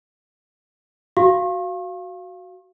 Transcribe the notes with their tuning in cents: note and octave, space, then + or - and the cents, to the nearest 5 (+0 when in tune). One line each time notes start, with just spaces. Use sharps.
F#4 +0 F5 -10 C#6 -45